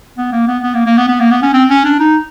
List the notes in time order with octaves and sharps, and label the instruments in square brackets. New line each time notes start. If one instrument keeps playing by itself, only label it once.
[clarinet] B3
A#3
B3
B3
A#3
A#3
B3
B3
A#3
B3
C#4
C4
C#4
D4
D#4